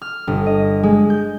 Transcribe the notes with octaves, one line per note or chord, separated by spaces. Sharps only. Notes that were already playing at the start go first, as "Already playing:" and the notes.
F6
G1
D#5
G#3
G6